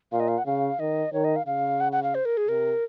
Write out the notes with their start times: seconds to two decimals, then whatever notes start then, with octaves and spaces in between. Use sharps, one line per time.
0.12 A#2 F5
0.20 D#5
0.28 F5
0.38 F#5
0.46 C#3 F5
0.80 D#3 D#5
1.13 D#3 C#5
1.24 D#5
1.36 F5
1.46 C#3 F5
1.80 F#5
1.92 F#5
2.03 F5
2.15 C5
2.25 A#4
2.37 G#4
2.48 C3 A#4